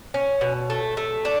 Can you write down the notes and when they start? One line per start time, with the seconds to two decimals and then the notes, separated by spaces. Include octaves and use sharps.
0.14 C#4
0.41 B2
0.70 A3
0.97 A3
1.25 D4